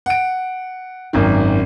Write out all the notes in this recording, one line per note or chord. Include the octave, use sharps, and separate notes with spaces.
F#5 D7
G#1 F#2 D#3